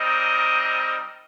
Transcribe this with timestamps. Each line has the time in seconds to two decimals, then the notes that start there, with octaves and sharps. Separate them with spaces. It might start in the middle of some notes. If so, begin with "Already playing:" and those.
Already playing: G3 C4 D#4 A#4 D#5